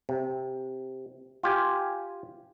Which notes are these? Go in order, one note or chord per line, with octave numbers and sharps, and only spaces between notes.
C3
F4 G4 G#5